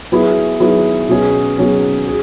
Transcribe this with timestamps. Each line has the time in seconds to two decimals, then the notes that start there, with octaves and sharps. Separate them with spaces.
0.12 F#3 B3 E4 G#4
0.60 F#3 B3 E4 G#4
1.09 B2 F#3 C#4 G#4
1.58 B2 F#3 C#4 G#4
2.07 G#4